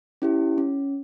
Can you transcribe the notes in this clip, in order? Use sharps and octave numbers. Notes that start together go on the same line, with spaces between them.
C#4 E4 G4
C#4